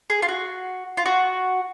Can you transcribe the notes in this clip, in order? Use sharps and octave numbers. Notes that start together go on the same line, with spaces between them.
G#4
F4
F#4
F4
F#4